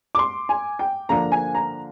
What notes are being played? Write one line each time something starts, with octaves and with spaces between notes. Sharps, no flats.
D6
C6
G#5
G5
D3 F3 A#3 D4 A#5
G#5
A#5